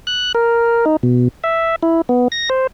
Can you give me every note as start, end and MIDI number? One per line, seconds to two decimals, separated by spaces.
0.07 0.32 90
0.35 0.85 70
0.86 0.97 63
1.03 1.28 47
1.44 1.76 76
1.83 2.01 64
2.09 2.28 59
2.32 2.49 94
2.50 2.67 72